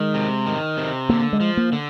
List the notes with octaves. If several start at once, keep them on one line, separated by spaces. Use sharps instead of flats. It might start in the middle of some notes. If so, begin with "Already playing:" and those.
Already playing: D#3 G#3
C3
D#3
C3
D3 A#3
G#3
F3
A#3
D3